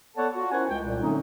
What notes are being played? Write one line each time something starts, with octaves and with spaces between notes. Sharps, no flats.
B3 A4 C#5 D5 F#5 A5
F4 F#4
C#4 E4 A#4 C5 F#5 G#5
C#2 G5
C2 A#2
D3 F#3 A3 C4 C#4 D#4